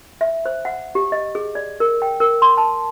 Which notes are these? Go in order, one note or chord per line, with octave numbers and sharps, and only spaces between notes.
E5
C5
F#5
G4
D#5
G#4
D5
A#4
G5
A#4
C6
A5